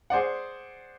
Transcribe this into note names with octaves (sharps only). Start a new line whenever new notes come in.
G#4 C5 D5 F#5